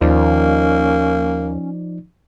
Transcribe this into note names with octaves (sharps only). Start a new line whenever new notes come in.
D#2 F3 A#3 C#4 D#4 D5